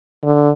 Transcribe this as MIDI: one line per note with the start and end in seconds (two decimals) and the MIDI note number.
0.23 0.50 50